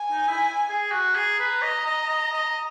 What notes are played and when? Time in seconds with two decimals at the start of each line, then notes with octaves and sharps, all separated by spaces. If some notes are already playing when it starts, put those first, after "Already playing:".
Already playing: G#5
0.11 D#4
0.28 E4
0.69 G#4
0.92 F#4
1.15 G#4 A#5
1.39 B4
1.62 D#5
1.86 D#5
2.09 D#5
2.33 D#5